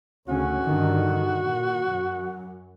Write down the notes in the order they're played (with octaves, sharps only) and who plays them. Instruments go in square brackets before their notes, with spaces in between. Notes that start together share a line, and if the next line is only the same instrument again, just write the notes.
[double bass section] D2 C#3 C#4 [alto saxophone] F#4
[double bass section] G2 D3 D#3
A#2
F#2